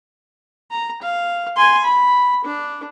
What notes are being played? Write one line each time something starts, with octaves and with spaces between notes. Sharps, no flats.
A#5
F5
G#5 C6
B5
D4